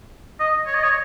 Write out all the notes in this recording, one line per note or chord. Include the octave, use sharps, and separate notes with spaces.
D#5
C#5
D#5
C#5